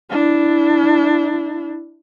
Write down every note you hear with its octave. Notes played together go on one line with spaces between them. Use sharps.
D4 E4